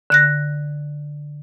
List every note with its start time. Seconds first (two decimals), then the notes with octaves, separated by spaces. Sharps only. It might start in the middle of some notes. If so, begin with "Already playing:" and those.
0.10 D3 F#6 A#6